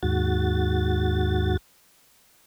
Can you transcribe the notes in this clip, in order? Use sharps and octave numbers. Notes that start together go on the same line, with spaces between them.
D#2 G#2 F#4 A6